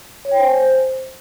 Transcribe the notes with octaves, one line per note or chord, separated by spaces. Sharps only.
C#5
G5
C5
G#5
C5